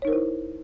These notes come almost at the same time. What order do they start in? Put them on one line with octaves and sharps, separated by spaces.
C#5 D#4 A#4 C5 E4